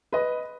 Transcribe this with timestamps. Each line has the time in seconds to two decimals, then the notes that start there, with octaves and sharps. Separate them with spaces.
0.12 B4 D#5